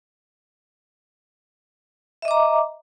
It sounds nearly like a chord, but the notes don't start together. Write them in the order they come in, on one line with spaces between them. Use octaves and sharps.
E5 D#5 D6 A#5